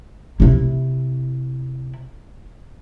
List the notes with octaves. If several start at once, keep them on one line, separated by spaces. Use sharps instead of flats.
C3 E4